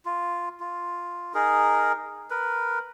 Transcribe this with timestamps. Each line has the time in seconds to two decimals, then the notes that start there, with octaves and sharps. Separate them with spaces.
0.05 F4
0.60 F4
1.34 D#4 G#4 A#4
2.30 A#4 B4